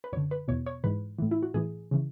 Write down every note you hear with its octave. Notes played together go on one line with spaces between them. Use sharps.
B4
F#2 D3 C#5
B4
E2 B2 C#5
C#5
G#2 E3 B4
A2 E3
E4
F#4
A2 E3 G#4
C#3 E3